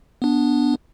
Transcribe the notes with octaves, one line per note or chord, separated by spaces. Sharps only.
B3 D4